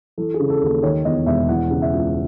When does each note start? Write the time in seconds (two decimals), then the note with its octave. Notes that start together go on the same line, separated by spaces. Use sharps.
0.18 E3 A4
0.34 G#4
0.40 C#3
0.50 A4
0.61 D#2
0.83 D#3 C#5
1.05 E2 D#5
1.26 E1 E5
1.48 E3 F#5
1.70 C#3
1.82 E5
1.93 C#2